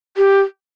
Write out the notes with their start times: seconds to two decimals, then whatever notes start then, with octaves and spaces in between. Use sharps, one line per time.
0.17 G4